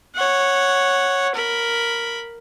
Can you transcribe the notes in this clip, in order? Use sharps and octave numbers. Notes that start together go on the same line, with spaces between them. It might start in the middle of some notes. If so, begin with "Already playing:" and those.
C#5 F#5
A#4 B5